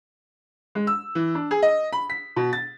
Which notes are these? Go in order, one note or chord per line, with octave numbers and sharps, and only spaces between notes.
G#3
E6
E3
D4
G#4
D#5
B5
B6
B2
A6